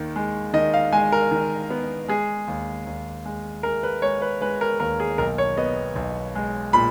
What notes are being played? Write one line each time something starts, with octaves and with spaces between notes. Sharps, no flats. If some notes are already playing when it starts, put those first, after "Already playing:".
Already playing: D#2 D#3
G#3
D#3 D#5
F5
G#3 G#5
A#4
D#3
B3
G#3 G#4
D#2
D#2
G#3
G#3 A#4
B4
G#3 C#5
B4
G#3 B4
A#4
D#2 A#4
G#4
B1 A#4
C#5
B3 D#5
B1
G#3
A#2 B5